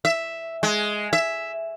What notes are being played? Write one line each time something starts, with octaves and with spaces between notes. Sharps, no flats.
E5
G#3
E5